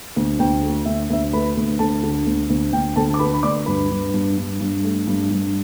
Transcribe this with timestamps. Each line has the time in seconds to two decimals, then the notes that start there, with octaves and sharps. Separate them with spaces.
0.16 D2
0.39 D2 G5
0.63 A3
0.85 D2 E5
1.10 D2 E5
1.33 A3 B4 B5
1.57 D2
1.79 D2 A4 A5
2.03 D3
2.27 D2
2.50 D2
2.73 D2 G5
2.96 D2 A4 A5
3.14 D6
3.19 D3 B4 B5
3.34 B5
3.43 D2 D5 D6
3.66 G2 B4 B5
3.90 G2
4.14 G2
4.37 G2
4.61 G2
4.83 A3
5.07 G2
5.31 G2